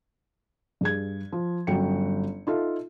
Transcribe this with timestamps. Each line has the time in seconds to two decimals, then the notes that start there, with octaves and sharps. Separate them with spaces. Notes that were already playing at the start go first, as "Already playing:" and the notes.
0.81 G2 G#4 G#6
1.32 F3
1.67 G1 F#3 C#4 F#4 G5 C#7
2.47 D#4 F4 A4 E5